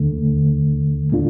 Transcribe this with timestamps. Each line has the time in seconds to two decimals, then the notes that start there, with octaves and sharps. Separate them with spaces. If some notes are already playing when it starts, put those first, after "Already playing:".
Already playing: D#2 D3 A3
1.11 A2 A3 D4 F4